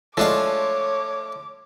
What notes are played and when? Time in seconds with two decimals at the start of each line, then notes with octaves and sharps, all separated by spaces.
0.17 F3 G#3 A3 D4 C#5 F5 D6